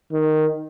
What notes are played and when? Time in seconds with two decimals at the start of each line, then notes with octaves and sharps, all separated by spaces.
0.12 D#3